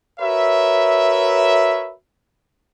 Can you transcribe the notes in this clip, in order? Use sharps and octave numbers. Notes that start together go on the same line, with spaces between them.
F#4 A#4 B4 C#5 E5